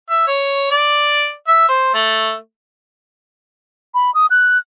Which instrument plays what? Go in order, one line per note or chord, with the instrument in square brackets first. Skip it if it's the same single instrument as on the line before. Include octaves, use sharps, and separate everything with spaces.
[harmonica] E5
C#5
D5
E5
C5
A3
[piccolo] B5
D#6
F#6